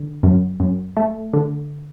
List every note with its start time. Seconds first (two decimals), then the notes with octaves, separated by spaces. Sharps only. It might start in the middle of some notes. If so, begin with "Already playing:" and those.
Already playing: D3
0.23 F#2
0.60 F#2
0.97 A3
1.33 D3